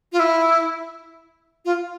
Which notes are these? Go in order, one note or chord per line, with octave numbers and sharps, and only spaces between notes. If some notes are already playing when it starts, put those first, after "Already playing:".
F4
E4
F4